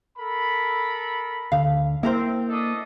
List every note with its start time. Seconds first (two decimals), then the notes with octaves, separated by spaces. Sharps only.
0.18 A4 A#4 B5
1.52 D2 D3 F5
2.03 A#3 C4 E4 A#4 C5
2.48 D4 A4 D#5